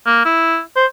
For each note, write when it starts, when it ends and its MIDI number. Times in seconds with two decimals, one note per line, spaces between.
0.07 0.22 58
0.25 0.59 64
0.76 0.86 72